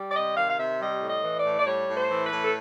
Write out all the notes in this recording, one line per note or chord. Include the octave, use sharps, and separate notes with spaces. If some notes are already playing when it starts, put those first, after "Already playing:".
Already playing: G3
D5
C3 D#5
D#3 F5
F5
C3 E5
G3 D#5
A2
D#5
E3
D5
A2
D5
G3 C#5
A2
C5
E3
B4
A2
A4